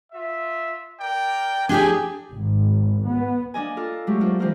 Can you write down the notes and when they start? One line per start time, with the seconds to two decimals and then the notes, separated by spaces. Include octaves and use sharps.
0.12 F4 E5
1.00 A#4 D5 G5
1.69 A3 D4 G4 G#4 G5 G#5
2.32 G#1
3.10 B3
3.54 A#3 D4 D#5 G#5
3.77 F4 A4 A#4
4.07 F#3 G#3 A3 G4
4.21 A#3 D4 F4 C5
4.39 E3 G#3 C4 F4 A#4 C5